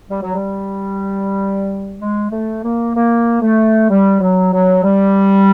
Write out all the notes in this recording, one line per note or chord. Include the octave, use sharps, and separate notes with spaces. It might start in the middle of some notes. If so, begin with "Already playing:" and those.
G3
F#3
G3
G#3
A3
A#3
A#3
A3
G3
F#3
F#3
G3